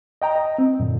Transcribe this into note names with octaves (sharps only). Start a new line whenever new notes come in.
D#5 G5 A#5
D#5
C4
F#2 A#2 D3